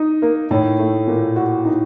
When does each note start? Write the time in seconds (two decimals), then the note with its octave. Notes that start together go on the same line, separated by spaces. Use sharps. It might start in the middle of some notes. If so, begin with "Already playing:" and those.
Already playing: D#4
0.22 A#3
0.50 A2 D#4
0.79 A3
1.07 A#2
1.36 F#4
1.65 D#4